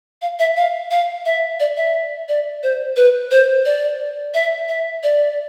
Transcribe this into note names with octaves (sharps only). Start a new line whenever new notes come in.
F5
E5
F5
F5
E5
D5
E5
D5
C5
B4
C5
D5
E5
E5
D5